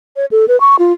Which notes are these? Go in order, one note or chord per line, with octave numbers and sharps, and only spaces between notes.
C#5
A4
B4
C#6
F4